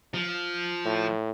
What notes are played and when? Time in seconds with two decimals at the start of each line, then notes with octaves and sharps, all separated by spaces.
0.14 F3
0.85 A2